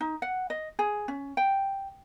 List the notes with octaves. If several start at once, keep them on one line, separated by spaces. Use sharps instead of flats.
D#4
F#5
D#5
G#4
C#4
G5